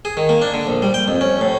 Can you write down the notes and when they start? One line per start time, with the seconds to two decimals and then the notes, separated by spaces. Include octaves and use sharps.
0.05 G#4
0.17 D#3
0.29 A#3
0.42 D4
0.54 D3
0.67 A#1
0.82 G3
0.94 G5
1.08 F2
1.21 C#4
1.41 A2